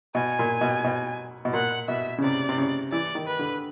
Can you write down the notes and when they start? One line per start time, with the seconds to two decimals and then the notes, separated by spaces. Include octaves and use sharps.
0.15 B2 G#5
0.39 A#2
0.61 B2
0.84 B2
1.45 B2
1.53 A#2 F#5
1.88 B2 E5
2.18 C#3
2.23 C3 D5
2.49 C3
2.58 C#3
2.92 E3 D5
3.15 D#3
3.27 B4
3.39 D3